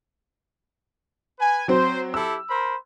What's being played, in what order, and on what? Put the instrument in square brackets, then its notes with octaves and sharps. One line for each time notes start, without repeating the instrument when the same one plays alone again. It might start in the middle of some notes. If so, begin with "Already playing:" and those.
[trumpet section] B4 G#5
[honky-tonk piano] F#3 C4 [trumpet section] C5
[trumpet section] E4 G4 A4 [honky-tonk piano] E6
[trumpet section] A#4 C5 B5